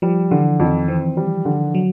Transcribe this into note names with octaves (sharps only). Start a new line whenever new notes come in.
F3 G3
D3 E3
F2 D#3
E3 C4
G3
D3
F#3